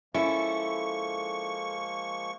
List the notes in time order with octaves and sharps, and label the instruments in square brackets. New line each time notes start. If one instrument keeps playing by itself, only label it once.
[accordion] F3 G#3 A#3 [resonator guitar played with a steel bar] C#4 E4 [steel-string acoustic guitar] A4 [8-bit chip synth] C#6